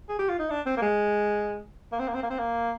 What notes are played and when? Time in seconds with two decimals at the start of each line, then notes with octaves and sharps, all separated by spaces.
0.09 G#4
0.19 G4
0.29 F4
0.39 D#4
0.50 D4
0.66 C4
0.77 A#3
0.82 G#3
1.92 A#3
1.99 C4
2.08 A#3
2.14 C4
2.23 A#3
2.30 C4
2.39 A#3